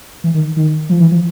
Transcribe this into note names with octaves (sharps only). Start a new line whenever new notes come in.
E3
D#3
D#3
F3
E3
F3